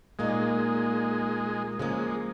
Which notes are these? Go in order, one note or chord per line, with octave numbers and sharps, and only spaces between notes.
A#2 G#3 A#3 D#4
C#3 F3 G#3 A#3